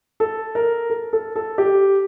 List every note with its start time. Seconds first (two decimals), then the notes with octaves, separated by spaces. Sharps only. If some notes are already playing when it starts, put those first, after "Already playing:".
0.20 A4
0.55 A#4
0.90 A4
1.13 A4
1.36 A4
1.58 G4